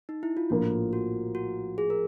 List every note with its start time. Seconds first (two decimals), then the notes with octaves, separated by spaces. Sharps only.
0.09 D#4
0.23 E4
0.37 F4
0.50 A#1 A2 F3 A#3 F#4
0.93 F#4
1.35 F#4
1.78 G#4
1.90 A#4